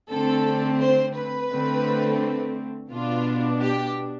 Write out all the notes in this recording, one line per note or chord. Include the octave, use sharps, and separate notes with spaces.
D3 A3 C4 A4
C5
B4
D3 A3 C4
B2 B3 D4 F4
G4